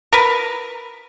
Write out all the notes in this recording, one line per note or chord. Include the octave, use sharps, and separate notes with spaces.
A#4 B4